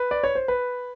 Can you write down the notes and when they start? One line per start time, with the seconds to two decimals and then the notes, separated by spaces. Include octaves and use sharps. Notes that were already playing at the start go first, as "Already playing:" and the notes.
Already playing: B4
0.11 D5
0.24 C#5
0.35 C5
0.48 B4